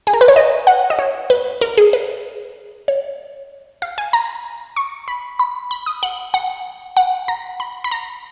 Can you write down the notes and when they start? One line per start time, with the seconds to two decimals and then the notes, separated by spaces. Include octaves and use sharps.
0.07 G#4
0.13 A#4
0.21 B4
0.28 C#5
0.36 D#5
0.67 F#5
0.90 D#5
0.99 C#5
1.30 B4
1.61 A#4
1.77 G#4
1.93 B4
2.88 C#5
3.82 F5
3.98 G#5
4.13 A#5
4.76 C#6
5.08 B5
5.39 B5
5.71 B5
5.86 D#6
6.03 F#5
6.34 F#5
6.97 F#5
7.28 A#5
7.60 B5
7.84 B5
7.91 A#5